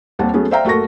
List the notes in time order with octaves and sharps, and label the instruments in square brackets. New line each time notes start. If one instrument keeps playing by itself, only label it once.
[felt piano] D#2 G3 C4 F#5 A5
F#3 A3 B3 C#4 G#4
C5 D5 E5 F5 G5 A#5
F#1 A3 F#4 A#4 C#6 A#6